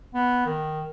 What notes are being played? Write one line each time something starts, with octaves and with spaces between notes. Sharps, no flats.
B3
D#3